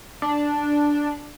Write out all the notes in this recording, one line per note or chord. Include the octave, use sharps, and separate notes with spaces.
D4